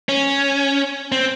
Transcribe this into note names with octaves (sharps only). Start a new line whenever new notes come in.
C#4
C4